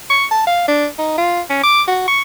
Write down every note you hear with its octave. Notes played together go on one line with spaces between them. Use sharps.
C#6
A5
F5
D4
D#4
F4
C#4
D6
F#4
C#6